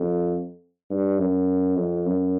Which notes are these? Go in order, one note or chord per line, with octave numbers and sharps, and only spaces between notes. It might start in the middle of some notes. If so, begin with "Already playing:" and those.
Already playing: F2
G2
F#2
F2
F#2